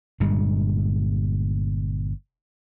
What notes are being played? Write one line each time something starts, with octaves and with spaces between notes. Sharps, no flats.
G1 G2 A#2 G#3